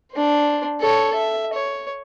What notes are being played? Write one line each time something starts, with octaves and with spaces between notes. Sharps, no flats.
D4 C5
A4 C#5
E5
C#5